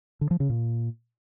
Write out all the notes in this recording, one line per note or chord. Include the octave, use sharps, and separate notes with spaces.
D3
F3
C#3
A#2